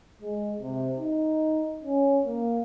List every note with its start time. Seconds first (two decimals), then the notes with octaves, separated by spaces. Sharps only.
0.22 G#3
0.60 C3
0.97 D#4
1.83 C#4
2.25 A#3